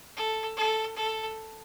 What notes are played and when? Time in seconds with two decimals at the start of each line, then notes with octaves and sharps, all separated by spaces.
0.17 A4
0.57 A4
0.96 A4